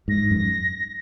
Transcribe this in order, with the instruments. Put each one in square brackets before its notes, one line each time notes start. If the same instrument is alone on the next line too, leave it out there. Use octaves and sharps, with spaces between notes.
[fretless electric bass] G#2 [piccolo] A#6
[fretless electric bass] F#2